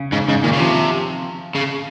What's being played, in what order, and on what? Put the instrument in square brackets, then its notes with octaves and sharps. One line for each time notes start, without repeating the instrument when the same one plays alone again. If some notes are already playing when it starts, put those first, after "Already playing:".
Already playing: [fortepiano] C#3
[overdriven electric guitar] G#2 [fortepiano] C#3
[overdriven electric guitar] G#2 [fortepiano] C#3
[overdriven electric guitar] A#2 [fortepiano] D#3
[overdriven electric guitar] C#3
[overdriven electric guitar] C3 [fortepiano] F3
[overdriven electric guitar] C#3